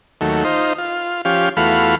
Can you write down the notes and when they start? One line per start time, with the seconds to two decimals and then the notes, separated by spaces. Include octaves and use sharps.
0.21 D#2 F#3 A3
0.45 D#4 F4 C5
0.78 F4
1.25 F3 C#4 G4 F5
1.57 E2 A3 F4 F#4 F5 B5